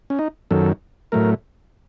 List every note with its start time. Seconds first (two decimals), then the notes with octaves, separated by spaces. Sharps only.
0.10 C#4
0.19 D#4
0.50 F#2 D#3 F#3 A4
1.12 A2 F#3 A3 A#4